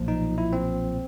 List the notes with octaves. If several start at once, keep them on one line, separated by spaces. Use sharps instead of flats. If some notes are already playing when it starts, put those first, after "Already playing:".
Already playing: B1 A#2 F3
D#4
E4
C4